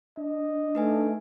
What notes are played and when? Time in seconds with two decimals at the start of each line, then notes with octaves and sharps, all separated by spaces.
0.17 D4 D#5
0.75 A3 D#4 B4 G#5